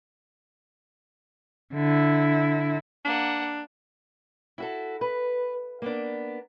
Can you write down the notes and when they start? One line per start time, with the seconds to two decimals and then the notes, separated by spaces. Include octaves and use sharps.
1.74 D3 E4
3.05 A#3 D4 F#5
4.58 E4 F#4 A4
5.01 B4
5.82 A#3 B3 D4